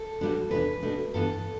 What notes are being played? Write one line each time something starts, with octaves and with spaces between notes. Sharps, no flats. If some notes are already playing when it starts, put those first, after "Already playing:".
Already playing: A4
B2 G3 B3 D4
E2 B2 B3 D4 B4
B2 A3 D4
G2 E3 B3 D4 A4